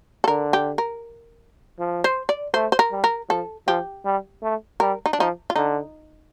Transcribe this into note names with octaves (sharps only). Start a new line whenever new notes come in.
A4
D3 A#4
G4
A#4
F3
C5
D5
A3 C5
C5
A#4
G3
A#4
F3 A4
F3 G4
G3
A3
G3 A#4
D#4
D4
F3 D#4
F4
D3 D#4